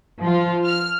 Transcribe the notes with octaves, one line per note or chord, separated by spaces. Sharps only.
F3 F4
F6